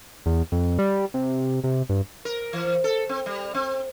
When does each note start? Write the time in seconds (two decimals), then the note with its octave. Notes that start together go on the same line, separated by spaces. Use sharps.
0.26 E2
0.52 F2
0.79 G3
1.14 C3
1.64 C3
1.89 G2
2.25 A#4
2.53 E3
2.84 A4
3.09 C4
3.26 G3
3.54 C4